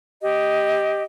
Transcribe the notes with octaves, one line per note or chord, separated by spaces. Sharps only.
G4 D#5